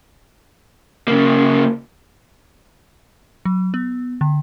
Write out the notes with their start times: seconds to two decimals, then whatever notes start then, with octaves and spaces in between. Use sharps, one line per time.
1.08 C#3 A#3
3.45 F#3
3.74 B3
4.21 D3